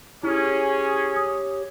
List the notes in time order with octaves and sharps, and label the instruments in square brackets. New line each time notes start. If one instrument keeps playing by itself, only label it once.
[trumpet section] C#4 G#4 [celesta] E4 [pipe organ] G4 C#5
[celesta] D#6